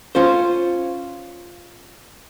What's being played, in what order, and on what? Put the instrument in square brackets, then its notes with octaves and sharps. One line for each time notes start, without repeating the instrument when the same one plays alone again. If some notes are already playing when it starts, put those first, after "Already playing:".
[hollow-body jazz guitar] C#4 F4 C5